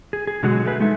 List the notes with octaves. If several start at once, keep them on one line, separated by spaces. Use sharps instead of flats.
G#4
G#4
B2 D3 F#3 G#3 F#4 G#4
A3 G#4 B4
G#3 D#4 A4 E5